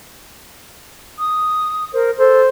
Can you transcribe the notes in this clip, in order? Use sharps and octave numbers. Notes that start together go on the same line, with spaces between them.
D#6
A#4 C5
A4 C5